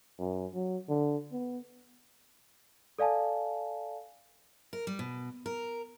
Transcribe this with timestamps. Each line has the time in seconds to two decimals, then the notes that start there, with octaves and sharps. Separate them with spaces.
0.19 F#2
0.54 F#3
0.89 D3
1.32 B3
2.99 A4 D5 F5 G#5 A5
4.73 A#4
4.87 G3
4.99 B2
5.46 A#4